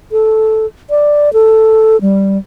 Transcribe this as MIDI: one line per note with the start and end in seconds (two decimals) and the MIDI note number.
0.12 0.66 69
0.90 1.32 74
1.33 2.00 69
2.01 2.38 55